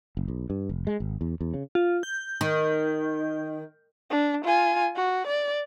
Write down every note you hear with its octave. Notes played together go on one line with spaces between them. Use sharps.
F#1
B1
G2
F1
G#3
G#1
E2
E2
C#3
F4
G6
D#3
D4
F4 G#5
F#4
D5